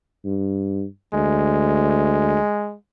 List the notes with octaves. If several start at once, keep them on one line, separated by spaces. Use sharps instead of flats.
G2
D2 G#3